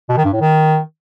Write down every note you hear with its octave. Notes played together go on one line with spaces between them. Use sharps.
B2
D#3
G2
A2
D#3